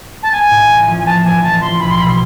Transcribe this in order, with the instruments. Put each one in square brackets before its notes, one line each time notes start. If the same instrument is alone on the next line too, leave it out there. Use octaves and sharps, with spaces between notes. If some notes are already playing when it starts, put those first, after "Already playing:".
[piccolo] A5
[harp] B3 [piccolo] G#5
[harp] A2
A1
F3
[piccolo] G#5
[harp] B3 [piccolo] A5
[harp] A2 [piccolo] G#5
[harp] A1 [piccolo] A5
[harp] F3 [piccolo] C6
[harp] B1 [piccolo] B5
[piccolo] C6
[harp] B2 [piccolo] B5
[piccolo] C6